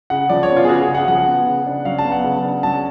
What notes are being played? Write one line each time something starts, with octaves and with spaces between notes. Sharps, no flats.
C#3 F#5
F3 D5
C#5
B3
F4
G#4
C#3 F#4
G#4
C#3
F#5
F3 F#5
B3
C#3
D4
F#3 F5
A5
B3
F#5
C#3
D4
F#3 A5